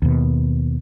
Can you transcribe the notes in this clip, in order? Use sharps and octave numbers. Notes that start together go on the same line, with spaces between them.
D#2 B2